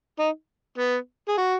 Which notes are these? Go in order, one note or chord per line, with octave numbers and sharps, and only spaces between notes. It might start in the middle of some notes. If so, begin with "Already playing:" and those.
D#4
B3
G#4
F#4